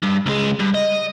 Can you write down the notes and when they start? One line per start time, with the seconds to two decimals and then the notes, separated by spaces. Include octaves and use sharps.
0.03 G2
0.26 C#2 G#3
0.59 G2
0.74 D#5